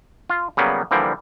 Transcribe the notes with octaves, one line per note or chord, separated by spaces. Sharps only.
F4
C#3 F#3 G3 A#3 B3
D3 E3 F3 G3 A#3